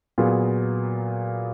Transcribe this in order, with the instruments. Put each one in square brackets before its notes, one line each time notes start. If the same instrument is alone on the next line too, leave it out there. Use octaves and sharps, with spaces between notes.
[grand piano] A#2 F#3 B3 F4 G#4